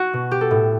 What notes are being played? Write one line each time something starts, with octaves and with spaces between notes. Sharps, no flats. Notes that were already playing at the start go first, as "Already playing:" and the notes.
Already playing: F#4
B2
G4
A4
A2